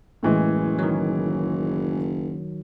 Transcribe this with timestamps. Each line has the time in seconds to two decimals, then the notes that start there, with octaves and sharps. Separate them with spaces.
0.23 F#1 A2 E3 G#3
0.79 D#3 F#3